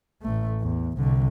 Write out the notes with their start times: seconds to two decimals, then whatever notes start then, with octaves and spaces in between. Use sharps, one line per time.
0.23 A1 A3
0.60 E2
0.97 C2 D3